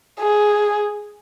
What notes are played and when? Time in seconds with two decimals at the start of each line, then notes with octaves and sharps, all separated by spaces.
0.20 G#4